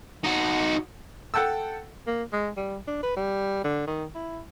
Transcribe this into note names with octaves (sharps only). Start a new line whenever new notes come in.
D#4 F#4
A4 F#5 G5 A5 E6
A#3
G#3
G3
D4
B4
G3
D3
D#3
E4